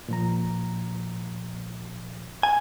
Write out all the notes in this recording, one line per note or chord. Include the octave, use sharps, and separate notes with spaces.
A#2 F3 A#5
G#5 A5